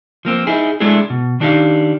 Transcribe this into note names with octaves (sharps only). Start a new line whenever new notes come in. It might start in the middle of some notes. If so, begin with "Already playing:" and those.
F3 A#3 C4
D#4 E4 G#4
G#3 A3 D4 E4 G#4
B2
D#3 D4 D#4 G4 F5